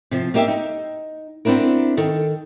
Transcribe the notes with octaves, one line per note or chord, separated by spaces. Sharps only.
C3 F3
A#3 D#4 G4 E5
D#4
B3 C4 D4 E4 A#4
D#3 A4